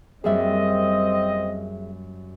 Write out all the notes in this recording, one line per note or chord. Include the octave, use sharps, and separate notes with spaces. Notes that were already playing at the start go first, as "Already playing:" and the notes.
F#2 G3 A#3 C4 G#4 D#5 E5